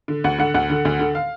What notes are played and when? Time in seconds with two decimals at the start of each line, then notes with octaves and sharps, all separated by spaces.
0.08 D3
0.24 D2 F#5
0.39 D3 F#5
0.54 D2 F#5
0.70 D3
0.85 D2
0.99 D3
1.15 F5